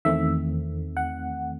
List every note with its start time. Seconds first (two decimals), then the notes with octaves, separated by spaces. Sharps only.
0.05 E2 D#3 A3 C4 E5
0.97 F#5